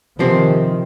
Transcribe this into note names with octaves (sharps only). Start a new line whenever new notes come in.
C3 D#3 F3 C4 G4 C5